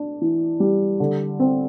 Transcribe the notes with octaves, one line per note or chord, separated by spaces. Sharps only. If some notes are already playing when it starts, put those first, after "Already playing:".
Already playing: D4
E3
G3
D3
C4